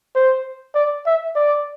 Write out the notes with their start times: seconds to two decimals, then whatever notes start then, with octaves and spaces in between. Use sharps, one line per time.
0.15 C5
0.75 D5
1.06 E5
1.35 D5